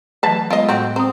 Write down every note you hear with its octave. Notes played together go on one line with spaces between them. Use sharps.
E3 F#3 A3 B4 A5
G#3 B3 F4 D#5
A2 C4 F#4
C4 C5 A#5 D#6